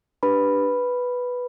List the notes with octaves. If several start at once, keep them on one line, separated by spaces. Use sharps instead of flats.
D4 G4 B4 B5